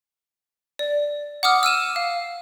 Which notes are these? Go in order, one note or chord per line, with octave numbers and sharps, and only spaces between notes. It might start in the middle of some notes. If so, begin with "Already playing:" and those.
D5
F#5 D6 D#6 F6
E6 F6 D#7 E7
F5